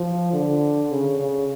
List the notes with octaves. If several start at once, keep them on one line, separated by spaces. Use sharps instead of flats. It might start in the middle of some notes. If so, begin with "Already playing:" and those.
Already playing: F3
D3
C#3
C#3